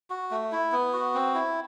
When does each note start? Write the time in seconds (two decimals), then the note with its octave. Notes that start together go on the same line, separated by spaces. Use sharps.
0.10 F#4
0.31 A3
0.52 E4
0.72 B3
0.93 F#4
1.14 C4
1.35 E4